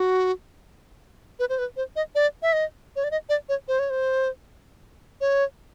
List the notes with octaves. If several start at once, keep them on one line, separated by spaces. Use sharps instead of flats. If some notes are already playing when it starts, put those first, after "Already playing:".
Already playing: F#4
B4
C5
B4
C5
D#5
D5
E5
D#5
C#5
D5
D#5
D5
C#5
C5
C#5
C5
C#5